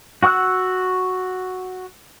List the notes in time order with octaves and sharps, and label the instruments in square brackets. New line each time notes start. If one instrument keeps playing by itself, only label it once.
[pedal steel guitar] F#4 F#5 C#6 E6 F#6